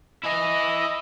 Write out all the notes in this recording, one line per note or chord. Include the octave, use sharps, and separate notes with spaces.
E4 D#5 G#5